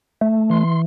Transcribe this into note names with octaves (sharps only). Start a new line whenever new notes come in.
A3
E3 C6